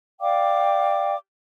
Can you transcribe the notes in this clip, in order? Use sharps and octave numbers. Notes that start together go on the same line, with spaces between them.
D5 F5 G5 D6